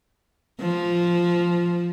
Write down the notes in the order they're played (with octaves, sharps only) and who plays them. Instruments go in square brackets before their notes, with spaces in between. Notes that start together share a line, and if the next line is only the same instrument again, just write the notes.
[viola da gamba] F3